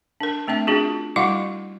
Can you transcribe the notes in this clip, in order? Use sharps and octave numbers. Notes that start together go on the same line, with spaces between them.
D4 A#4
A3 C4 D4 E5
C#4 D4 F4 F#4 G#4
G3 E4 F#4 F5 F#5 C#6